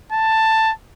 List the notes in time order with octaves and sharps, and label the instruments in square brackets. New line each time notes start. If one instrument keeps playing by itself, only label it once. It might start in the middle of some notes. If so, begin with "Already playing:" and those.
[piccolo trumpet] A5